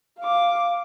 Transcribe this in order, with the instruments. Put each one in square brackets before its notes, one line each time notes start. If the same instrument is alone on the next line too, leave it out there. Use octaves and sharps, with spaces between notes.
[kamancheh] F5 D6